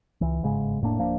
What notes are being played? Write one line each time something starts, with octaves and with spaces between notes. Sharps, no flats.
C#2 E3
G1 G#2 C#3 G#3
F1 A2 A#3 D4
D1 F3 A#3 D4